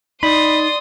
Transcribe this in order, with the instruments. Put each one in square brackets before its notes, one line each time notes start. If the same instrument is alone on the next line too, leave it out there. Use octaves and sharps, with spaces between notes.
[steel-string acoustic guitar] D#4 [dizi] D5 [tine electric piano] B5 [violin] C6 D#6